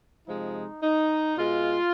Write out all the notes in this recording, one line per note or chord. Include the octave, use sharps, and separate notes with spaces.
C3 F3 G#3 D#4
D#4
B2 G#3 F4